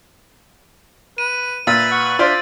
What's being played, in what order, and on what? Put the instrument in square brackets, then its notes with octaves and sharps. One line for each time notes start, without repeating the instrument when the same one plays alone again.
[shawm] B4 [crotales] D#7
[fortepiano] A#2 [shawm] B4 [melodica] E5 [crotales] E6 A6
[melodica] F#5 C#6
[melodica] D4 E5 [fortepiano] F4 C5 D5